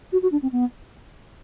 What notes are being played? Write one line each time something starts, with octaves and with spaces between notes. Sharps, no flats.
F#4
F#4
D4
C4
B3